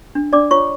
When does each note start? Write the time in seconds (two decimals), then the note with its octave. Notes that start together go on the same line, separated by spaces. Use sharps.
0.15 D4
0.33 D4 D5 D6
0.51 F4 C#5 C#6